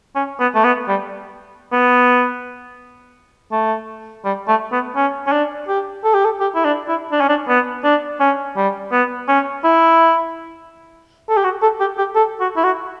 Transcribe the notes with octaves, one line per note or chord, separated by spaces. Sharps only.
C#4
B3
A3
B3
G3
B3
A3
G3
A3
B3
C#4
C#4
D4
G4
A4
G4
A4
G4
E4
D4
E4
D4
C#4
D4
B3
D4
C#4
G3
B3
C#4
E4
A4
G4
F#4
A4
G4
G4
A4
F#4
E4
F#4